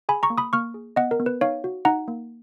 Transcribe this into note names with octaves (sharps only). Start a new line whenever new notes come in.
G#4 G#5 B5
A#5 C#6
A#3
B5 D#6
A#3 C#6 F6
G#4
B3 D#5 F#5
A#4
B3
B4
D#4 C#5 F5
F#4
D#4 F#5 A#5
A#3